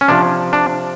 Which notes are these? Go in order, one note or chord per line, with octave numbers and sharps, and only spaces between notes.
C#4
C3 F3 D4
D4